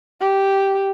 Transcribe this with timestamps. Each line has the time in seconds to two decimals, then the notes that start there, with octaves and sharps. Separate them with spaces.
0.21 G4